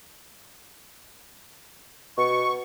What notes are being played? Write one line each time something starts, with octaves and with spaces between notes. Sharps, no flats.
B2 C#6